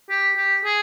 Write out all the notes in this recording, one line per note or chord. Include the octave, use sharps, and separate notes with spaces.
G4
G4
G#4